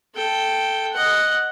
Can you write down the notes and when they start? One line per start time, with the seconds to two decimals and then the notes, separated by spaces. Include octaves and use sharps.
0.15 A4 G5
0.93 D#5 F#5